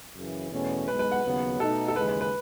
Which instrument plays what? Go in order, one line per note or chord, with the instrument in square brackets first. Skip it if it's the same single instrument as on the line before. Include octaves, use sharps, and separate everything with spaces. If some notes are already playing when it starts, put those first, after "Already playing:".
[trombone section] F#2 C#3 E3
E2 B2 A3 C#4
[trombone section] B1 B2 G#3 [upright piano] B4
[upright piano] B4
F#5
[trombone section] D#2 C#3 F#3 B3
[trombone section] B2 A3 D#4 [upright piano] A4
[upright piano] A4
[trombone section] D#2 C#3 E3 G#3 [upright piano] B4
[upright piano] B4
B4